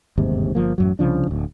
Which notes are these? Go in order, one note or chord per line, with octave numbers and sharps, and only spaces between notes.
G1 D#2 G#2 C3
G1 F3 A#3
A1 F#2 F#3
C2 C#3 F3 D4
D1 D2